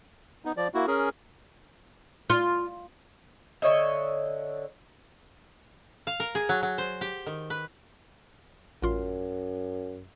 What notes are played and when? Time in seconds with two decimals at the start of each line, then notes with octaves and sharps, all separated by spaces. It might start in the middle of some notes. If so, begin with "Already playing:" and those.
0.45 B3 D#4
0.57 F3 D5
0.74 A#3 E4 F#4
0.87 C#4 G#4 A#4
2.30 F4
3.62 D3 C#5 D#5 E5
6.07 F5
6.20 A#4
6.35 G#4
6.49 F#3
6.63 F#3
6.78 C5
7.01 G4
7.26 D#3
7.50 B4
8.83 A1 F#2 F4 C6